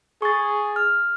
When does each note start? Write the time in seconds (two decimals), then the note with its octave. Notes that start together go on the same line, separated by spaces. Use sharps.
0.22 G#4 C#6 A6
0.76 F6